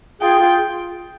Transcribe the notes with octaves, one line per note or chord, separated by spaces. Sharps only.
F4 G#4 G5
F4 G#4